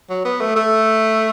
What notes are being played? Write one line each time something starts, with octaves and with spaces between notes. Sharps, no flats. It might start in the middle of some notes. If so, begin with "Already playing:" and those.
F#3
B3
A3
A3